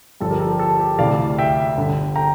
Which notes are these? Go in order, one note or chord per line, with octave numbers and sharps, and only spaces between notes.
G1 G2 F3 A4
G4 A#4
A4
G4
A4
G4
D2 C3 E3 A3 D5 F5
E5 G5
G1 G2 D3
G5 A#5